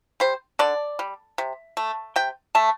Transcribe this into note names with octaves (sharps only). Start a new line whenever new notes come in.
G3 C5
D3 D5
G3
C3
A3
C3 G5
A3 A5